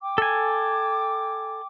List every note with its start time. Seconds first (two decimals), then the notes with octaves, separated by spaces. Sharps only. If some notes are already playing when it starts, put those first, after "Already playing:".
0.02 G5 D6
0.18 A4 G#5